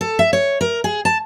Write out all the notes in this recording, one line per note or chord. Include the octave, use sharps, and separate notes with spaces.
A4
E5
C#5
A#4
G#4
A5